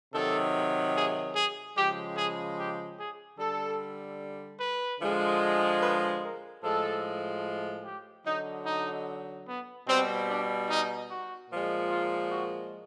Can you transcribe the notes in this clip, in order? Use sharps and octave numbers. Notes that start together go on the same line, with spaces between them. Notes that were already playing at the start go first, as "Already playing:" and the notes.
C3 D#3 F#3 A4
G#4
G#4
C#3 F3 G#3 G4
G#4
G4
G#4
D3 G3 A4
B4
D3 F3 G#3
B4
A#4
A2 F3 G#3 A4
G4
D3 F#3 D#4
D#4
B3
B2 G3 C4
D4
D#4
F#4
A#2 F3 G#3
F4
F#4